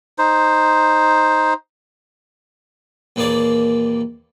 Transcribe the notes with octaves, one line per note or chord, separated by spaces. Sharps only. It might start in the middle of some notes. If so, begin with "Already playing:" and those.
D#4 C5
D#2 A#2 E3 A#3 G#4 D5